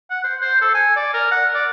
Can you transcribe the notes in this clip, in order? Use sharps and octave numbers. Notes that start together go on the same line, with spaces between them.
F#5
C5
C5
A4
G#5
D5
A#4
F#5
D5